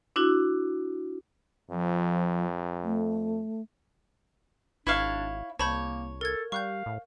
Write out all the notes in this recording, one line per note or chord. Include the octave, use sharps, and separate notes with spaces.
D4 E4 F#4
F2 F3
A3
G#1 D4 E4 C#5 F5
C2 A#3 C#5 A5 B5 G6
A4 A#4 G#6
G3 F5 C#6 F#6 G6
A2